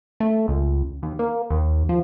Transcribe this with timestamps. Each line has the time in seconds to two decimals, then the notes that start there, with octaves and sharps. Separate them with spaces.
0.20 A3
0.48 C#2
1.02 D#2
1.19 A#3
1.50 D#2
1.89 F3